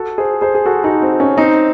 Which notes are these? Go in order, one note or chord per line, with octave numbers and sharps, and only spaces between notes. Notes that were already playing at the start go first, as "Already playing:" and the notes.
Already playing: F#4 A4
G#4 C5
G#4 C5
G#4
F#4 A4
D#4 F#4
C4
C#4
C4 D#4